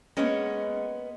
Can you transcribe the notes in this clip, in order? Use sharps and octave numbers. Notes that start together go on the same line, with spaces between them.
G#3 A#3 B3 C#4 D#5 F#5